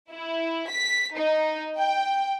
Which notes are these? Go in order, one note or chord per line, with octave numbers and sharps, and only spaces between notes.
E4
B6
D#4
G5